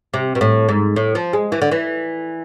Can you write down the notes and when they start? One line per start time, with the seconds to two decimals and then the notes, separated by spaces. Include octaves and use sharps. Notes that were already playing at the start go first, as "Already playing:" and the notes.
0.14 C3
0.35 B2
0.41 A2
0.69 G#2
0.96 A2
1.15 F3
1.33 G#3
1.52 E3
1.62 D3
1.71 E3